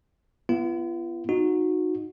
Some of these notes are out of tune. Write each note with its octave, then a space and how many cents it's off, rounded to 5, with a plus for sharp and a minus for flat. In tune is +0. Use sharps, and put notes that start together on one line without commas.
B3 +0 F4 -45
D#4 -5 F#4 -20